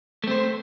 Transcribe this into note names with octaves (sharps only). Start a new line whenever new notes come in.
A3 C4 C5